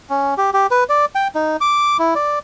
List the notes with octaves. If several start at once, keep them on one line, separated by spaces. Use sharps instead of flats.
C#4
G4
G4
B4
D5
G5
D#4
D6
E4
D5